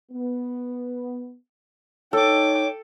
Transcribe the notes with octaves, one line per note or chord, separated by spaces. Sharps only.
B3
D#4 A4 C#5 G5 D6